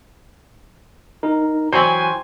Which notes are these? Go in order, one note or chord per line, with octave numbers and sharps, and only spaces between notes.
D#4 A#4
E3 F#3 C5 G5 G#5 C6